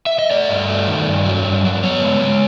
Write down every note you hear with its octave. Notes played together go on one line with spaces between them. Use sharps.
E5
D#5
A3 D5
G2
A3
D#3
G2
F#3
G2
F#3
B3 C#5
G#3
G#3